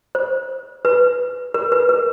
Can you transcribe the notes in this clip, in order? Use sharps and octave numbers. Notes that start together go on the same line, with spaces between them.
C5
B4
A#4
B4
A#4